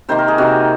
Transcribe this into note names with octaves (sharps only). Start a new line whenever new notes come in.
C3 D#3 A#3 C5
A#4
G#4
C3 D#3 A#3 F#4